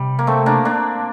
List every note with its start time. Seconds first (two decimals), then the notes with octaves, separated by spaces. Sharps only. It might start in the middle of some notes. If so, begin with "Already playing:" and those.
Already playing: C3 G3
0.19 A#3
0.27 A3 C4
0.46 A#3 D4
0.65 A#3 D4